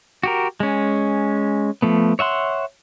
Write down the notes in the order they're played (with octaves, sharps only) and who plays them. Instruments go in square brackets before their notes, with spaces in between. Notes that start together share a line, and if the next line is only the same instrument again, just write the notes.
[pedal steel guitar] F#4 G4 A#4
G#3 C#4
F3 A3 B3
C#5 E5 F#5 C6